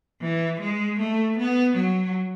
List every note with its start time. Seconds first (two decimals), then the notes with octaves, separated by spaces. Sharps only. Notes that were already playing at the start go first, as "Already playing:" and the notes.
0.21 E3
0.60 G#3
0.99 A3
1.38 B3
1.76 F#3